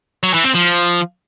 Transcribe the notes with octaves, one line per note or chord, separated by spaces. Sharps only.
F#3
E3
C4
F3